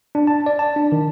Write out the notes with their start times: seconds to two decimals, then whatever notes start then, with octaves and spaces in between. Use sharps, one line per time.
0.15 D4
0.27 A5
0.46 D5
0.59 A5
0.76 D4
0.92 D#3